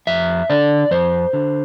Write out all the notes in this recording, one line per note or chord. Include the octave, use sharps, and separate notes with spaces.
F2 E5
D3 D5
F2 C5
D3